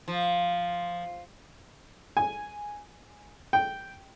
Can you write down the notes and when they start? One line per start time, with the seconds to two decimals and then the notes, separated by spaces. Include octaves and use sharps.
0.08 F3
2.17 G#5
3.53 G5